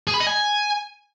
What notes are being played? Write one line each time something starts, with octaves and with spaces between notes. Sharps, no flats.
G#4
B5
D#5
G#5